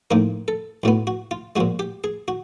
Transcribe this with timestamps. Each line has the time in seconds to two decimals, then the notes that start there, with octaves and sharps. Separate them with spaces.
0.11 A2 F3 A#3 D#4 A#4
0.48 A4
0.83 B1 A2 F#3 B3
1.07 F#4
1.31 F4
1.56 A#2 F3 G#3 F#4
1.79 G4
2.04 G#4
2.28 F#4